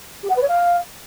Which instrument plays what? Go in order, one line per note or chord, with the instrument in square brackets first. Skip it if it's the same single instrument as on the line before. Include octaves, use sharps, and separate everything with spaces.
[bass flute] G4
F#5
B4
C#5
F5